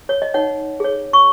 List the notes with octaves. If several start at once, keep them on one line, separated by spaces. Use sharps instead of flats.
C#5
D#5
D#4 C#5 F#5
G#4 C#5
C#6